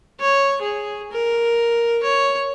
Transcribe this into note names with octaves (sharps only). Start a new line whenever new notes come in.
C#5
G#4
A#4
C#5